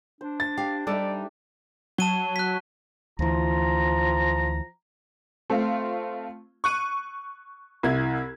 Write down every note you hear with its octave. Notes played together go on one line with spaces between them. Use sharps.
D4 C5
A6
G4 F5
G3 D4 D#4 A4 D5 E5
F#3 A5 D#7 G7
F#6 B6
D2 E3 F3 F4 A#5
A3 C4 F4
C#6 F#6 D#7
C2 E4 G#6